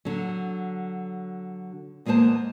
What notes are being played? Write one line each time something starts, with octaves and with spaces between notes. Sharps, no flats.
D3 F#3
E2 G#3 A#3 B3 C5 A5